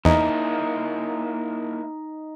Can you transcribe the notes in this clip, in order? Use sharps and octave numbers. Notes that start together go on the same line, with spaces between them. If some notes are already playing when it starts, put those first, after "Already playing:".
E2 A#3 D#4 E4